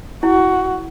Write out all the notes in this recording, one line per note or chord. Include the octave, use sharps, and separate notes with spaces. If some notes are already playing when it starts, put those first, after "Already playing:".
E4 F#4